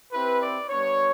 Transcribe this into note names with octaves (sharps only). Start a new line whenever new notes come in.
C4 E4 G4 B4
D5
G3 B3 D4 C#5